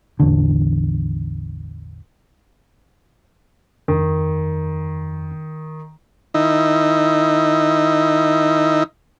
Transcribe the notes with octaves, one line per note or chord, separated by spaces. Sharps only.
A1 E2 D3
F2 D#3
D#3 D#4 E4